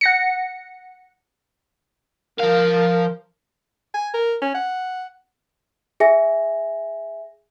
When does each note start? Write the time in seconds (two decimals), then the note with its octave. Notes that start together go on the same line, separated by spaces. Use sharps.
0.01 F#5 A#6 C#7
2.39 F3 A#4 F5
3.94 G#5
4.14 A#4
4.41 C#4
4.54 F#5
6.00 G#4 E5 G#5 A#6